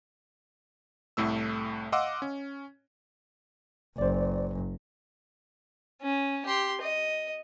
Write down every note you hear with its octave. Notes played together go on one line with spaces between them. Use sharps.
C2 A2 A3 E6
D#5 F5 F#5 C6 D6 E6
C#4
F#1 C5 D5
C#4
G4 C6
D#5